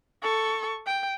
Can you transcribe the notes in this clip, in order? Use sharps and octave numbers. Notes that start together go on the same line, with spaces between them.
A4 C#6
G5